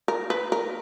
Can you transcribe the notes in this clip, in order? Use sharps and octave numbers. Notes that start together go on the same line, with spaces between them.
A#4
B4
A#4